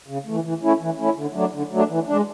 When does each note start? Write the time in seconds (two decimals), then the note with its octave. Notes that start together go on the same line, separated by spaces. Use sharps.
0.08 C#3
0.26 E3 A3
0.44 E3
0.62 A3 C#4 E4
0.80 E3
0.98 A3 C#4 E4
1.16 D3
1.34 F#3 A3 D4
1.53 D3
1.71 F#3 A3 D4
1.89 E3
2.07 G#3 D4